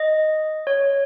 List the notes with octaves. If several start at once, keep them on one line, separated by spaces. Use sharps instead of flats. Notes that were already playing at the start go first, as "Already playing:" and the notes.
Already playing: D#5
C#5